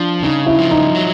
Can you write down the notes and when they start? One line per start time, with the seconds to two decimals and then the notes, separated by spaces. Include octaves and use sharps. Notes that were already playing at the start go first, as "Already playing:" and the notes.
Already playing: F3 D4
0.23 C#3 D#4
0.46 E4
0.59 F3
0.71 D#4
0.95 F#3